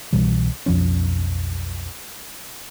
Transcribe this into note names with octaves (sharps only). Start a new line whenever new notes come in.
C2 B2 E3 G3
B1 F2 F3 C#4